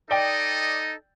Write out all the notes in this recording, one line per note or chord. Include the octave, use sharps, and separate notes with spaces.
D#4 A4 D5 D#5 G5